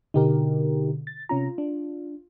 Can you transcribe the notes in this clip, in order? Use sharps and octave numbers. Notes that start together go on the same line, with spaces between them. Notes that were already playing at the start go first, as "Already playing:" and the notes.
B2 D3 D#4 G4 A#4
A6
C3 C#4 F4 A#5
D4